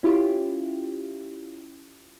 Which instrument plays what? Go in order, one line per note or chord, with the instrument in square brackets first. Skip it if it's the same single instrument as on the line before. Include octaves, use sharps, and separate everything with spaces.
[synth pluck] C#4 E4 F4 G4